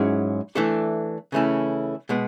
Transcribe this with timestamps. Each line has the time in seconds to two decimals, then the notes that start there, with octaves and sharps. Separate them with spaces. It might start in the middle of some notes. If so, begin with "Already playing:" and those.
Already playing: G#2 F#3 C#4 E4 G#4
0.55 E3 A3 D4 A4
1.32 C#3 E3 A3 C#4 E4
2.09 B2 G#3 B3